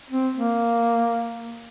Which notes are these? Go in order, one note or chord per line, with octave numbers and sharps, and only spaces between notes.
C4
A#3